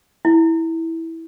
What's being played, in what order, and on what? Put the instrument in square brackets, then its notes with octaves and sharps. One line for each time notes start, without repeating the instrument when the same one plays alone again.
[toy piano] E4